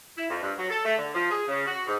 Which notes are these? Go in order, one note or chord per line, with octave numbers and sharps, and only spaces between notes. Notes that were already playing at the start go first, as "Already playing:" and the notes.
E4
F2
G2
F#3
A4
A3
D3
F3
G#4
C#3
F#4
G#2